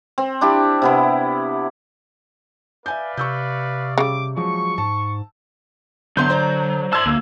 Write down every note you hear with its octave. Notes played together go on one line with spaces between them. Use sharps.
C4
D4 E4 G4
C3 B3 E4
B4 D5 E5 F5 G#5 G6
C3 C#6 E6 G6
C#3 G3 D6
F3 F#3 G#3 C#6
G#2 A5
E2 D3 F#3 B3 C6 G6
C5 D5 A#5
A5 C6 E6 G#6
D2 A#3